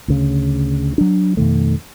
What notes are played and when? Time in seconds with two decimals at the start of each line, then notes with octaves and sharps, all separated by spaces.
0.08 D2 C#3
0.98 F#3 D4
1.37 F2 B2 D#3 A3